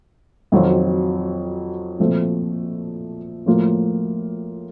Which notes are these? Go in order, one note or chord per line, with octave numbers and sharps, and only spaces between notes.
F2 D#3 F#3 C4 F4
A#2 F3 A3 C4
A2 F3 A#3 F4